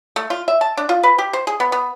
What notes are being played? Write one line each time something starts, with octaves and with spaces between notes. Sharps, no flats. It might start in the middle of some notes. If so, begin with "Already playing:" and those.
A3
F4
E5
A5
D4
F4
B4
G4
C5
G#4
B3
B3